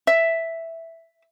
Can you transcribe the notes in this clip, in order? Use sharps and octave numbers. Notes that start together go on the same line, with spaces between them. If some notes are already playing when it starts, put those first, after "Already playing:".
E5